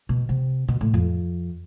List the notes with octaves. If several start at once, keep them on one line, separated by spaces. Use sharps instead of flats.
B2
C3
B2
A2
F2